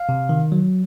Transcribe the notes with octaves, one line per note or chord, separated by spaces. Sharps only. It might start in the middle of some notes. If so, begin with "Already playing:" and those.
Already playing: F5
C3
D#3
F#3